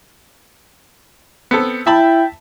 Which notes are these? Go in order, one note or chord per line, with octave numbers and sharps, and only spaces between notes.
B3 C4 A4
E4 E5 G5 A5 B5